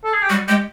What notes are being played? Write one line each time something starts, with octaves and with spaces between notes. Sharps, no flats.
A4
G#4
G4
G3 F#4
G#3 G4